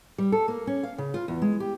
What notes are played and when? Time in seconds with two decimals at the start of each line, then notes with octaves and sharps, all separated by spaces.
0.18 G3
0.32 A4
0.48 A#3
0.67 C#4
0.83 F5
0.98 C#3
1.14 F4
1.28 E2
1.42 G#3
1.60 G4